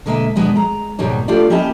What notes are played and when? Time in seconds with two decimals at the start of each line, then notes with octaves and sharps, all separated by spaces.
0.06 B2 D3 G#3 A#3 D#5 E5
0.36 D#2 B2 G#3 B3 D4
0.56 G#3 A#5
0.99 D#2 G#2 B2 D#3 G3 C#5
1.28 A3 D4 F4 G4 D5
1.50 A#3 C#4 E4 G4 D#5 A5